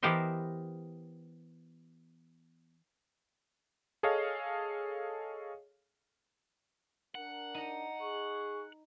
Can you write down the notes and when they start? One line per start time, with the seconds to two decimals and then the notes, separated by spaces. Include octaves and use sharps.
0.03 E3 B3 G4 A#4 C5 D#5
4.03 G#4 A4 C#5 D#5 F5
7.15 D4 A#4 F#5
7.54 D#4 D#5
8.01 G#4 C#6